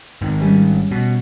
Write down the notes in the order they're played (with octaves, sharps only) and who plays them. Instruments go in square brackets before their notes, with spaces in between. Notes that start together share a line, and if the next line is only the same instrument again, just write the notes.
[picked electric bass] G#2 D#3
[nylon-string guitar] G3 C#4
[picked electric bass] B2